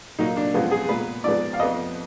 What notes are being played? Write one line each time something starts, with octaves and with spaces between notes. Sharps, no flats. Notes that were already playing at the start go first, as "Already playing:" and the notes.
A#2 F#3 A#3 D#4
D4
F#2 F3 G#3 B3 F4
G#4
A#2 G#3 B3 B4
G#2 F3 G#3 B3 D5
F5
F2 F3 B3 D#5